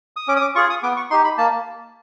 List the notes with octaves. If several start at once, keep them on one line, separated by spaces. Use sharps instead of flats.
D#6
C#4 D6
D#6
D6
F4 G#4 C#6
D#6
B3 D6
C#6
D#4 G4 C6
B5
A#3 A5